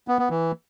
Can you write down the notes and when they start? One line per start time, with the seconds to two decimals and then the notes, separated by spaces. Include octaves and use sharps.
0.08 B3
0.19 B3
0.30 E3